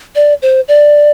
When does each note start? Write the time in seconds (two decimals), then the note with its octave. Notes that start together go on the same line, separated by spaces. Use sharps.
0.15 D5
0.42 C5
0.68 D5